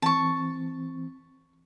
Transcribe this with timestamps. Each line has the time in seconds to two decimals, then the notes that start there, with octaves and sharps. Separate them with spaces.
0.02 E3 C4 A5 C#6